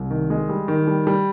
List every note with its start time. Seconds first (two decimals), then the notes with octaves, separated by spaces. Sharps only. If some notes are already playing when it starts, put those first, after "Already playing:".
Already playing: C2
0.11 D#3
0.30 G#3
0.49 G3
0.68 D#3
0.87 G3
1.07 G3